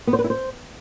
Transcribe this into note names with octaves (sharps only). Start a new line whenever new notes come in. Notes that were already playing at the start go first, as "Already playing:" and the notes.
B3
C5
B4
E4
C5